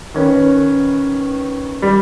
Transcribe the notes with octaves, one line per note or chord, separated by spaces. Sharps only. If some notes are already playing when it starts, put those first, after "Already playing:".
D#3 C#4 B4
G3